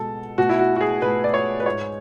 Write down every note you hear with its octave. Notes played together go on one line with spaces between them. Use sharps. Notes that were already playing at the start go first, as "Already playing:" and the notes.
Already playing: B2 G#3 A4
B2 A3 F#4
E4
F#4
F#4
G#4
B2 A3 B4
D5
C#5
B4
G#2 G#3 C#5